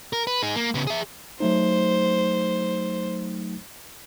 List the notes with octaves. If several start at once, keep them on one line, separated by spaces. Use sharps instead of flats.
A#4
B4
D#4 G#4
A#3
C#3 B3
G#4 E5
F#3 A3 D#4 C5